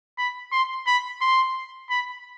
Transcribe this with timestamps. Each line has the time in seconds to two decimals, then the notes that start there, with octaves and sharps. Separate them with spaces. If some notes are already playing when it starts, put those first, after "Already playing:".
0.18 B5
0.52 C6
0.87 B5
1.21 C6
1.90 B5